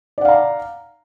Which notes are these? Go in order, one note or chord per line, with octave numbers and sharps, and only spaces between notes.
D5 F5 F#5 A#5